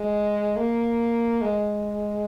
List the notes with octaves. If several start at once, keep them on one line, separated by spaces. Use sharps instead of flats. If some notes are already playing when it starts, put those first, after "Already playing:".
Already playing: G#3
A#3
G#3